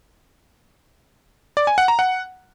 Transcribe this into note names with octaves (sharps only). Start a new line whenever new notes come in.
D5
G#5
F#5
A#5
F#5